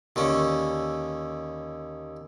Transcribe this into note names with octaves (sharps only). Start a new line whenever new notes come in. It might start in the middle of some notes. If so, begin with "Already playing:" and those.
D#2 D3 C#4